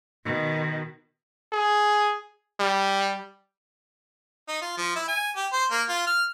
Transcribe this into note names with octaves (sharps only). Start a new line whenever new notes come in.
B2 D#3
G#4
G3
D#4
F4
F3
E4
G#5
G4
C5
A#3
F4
F6